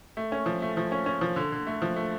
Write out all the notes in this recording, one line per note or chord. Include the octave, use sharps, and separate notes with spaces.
A3
C#4
F3
A3
F3
C#4
C#4
F3
D3
D3
A3
F3
A3